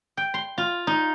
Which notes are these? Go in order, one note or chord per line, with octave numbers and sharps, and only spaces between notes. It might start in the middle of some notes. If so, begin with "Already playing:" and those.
G5
C6
F4
D#4